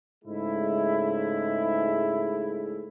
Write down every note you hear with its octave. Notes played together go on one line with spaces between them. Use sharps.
G#2 C#3 G#3 A3 E4